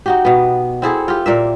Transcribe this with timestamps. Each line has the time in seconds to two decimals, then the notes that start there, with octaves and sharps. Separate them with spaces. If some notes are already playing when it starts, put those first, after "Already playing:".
0.06 D#4 F#4 G4
0.25 B2 B3
0.82 C4 E4 G#4 A4
1.08 F4 G4
1.26 A#2 A#3 E5